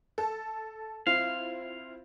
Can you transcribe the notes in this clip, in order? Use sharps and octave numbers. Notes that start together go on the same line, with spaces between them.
A4
C4 E4 F4 F5